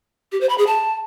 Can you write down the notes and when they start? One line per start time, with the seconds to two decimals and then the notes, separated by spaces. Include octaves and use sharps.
0.32 G4
0.41 C5
0.49 B5
0.58 G#4
0.67 A5